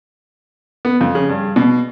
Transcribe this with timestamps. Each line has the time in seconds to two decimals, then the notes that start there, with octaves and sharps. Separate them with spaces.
0.85 B3
1.01 F2
1.15 C#3
1.29 G2
1.56 B2